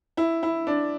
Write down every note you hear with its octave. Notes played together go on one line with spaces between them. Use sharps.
E4
E4
D4